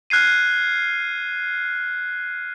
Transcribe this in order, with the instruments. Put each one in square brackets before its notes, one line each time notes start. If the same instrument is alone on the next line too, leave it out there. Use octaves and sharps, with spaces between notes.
[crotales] F6 F#6 G#6 C7 D#7